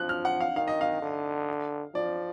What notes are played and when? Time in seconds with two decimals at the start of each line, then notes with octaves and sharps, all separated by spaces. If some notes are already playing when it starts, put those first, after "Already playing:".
Already playing: F3 F#6
0.09 F6
0.25 F#5
0.41 F5
0.56 D#3 F5
0.68 D#5
0.81 F5
1.02 D3
1.94 F3 D5